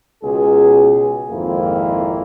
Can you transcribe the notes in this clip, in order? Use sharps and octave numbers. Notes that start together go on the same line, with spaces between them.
C#2 B2 G#4
G#1 F2 A#3 E4 F4